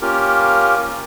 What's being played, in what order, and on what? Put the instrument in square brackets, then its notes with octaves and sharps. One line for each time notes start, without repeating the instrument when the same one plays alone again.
[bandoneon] A#3 C#4 F4 G4 A#4